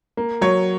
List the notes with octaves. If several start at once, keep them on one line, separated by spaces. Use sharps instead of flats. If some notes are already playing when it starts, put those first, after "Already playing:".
A#3
F#3 C#5